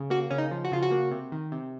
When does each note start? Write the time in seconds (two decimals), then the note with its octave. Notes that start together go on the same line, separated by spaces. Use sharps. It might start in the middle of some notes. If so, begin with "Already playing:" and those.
Already playing: C#3
0.10 A#3 F#4
0.30 C#3 C#4
0.38 D#4
0.51 F3
0.64 F#4
0.72 C#3 F4
0.82 F#4
0.91 A#3
1.11 C3
1.32 D#3
1.52 C3